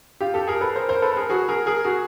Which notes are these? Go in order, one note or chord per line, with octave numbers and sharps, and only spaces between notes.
F4 G4
G4 A4
G#4 A#4
A4 B4
A#4 C5
A#4 C5
A4 B4
B4
G#4 A#4
F#4 G#4
G#4 A#4
G#4 A#4
F#4 G#4